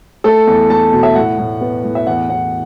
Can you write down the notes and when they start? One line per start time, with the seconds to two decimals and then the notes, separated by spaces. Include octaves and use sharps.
0.24 A3 A4
0.47 E2
0.70 A3 A5
0.93 B2
1.03 E5
1.15 A2 F#5
1.38 A2
1.61 B3
1.84 A2
1.95 E5
2.06 E2 F#5
2.30 E2 F#5